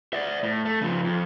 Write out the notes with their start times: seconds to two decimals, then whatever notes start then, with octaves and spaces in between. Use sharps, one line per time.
0.13 D5 E5
0.43 A2
0.65 A3
0.81 C#3 F3
1.04 F2